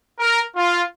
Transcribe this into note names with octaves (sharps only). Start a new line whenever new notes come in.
A#4
F4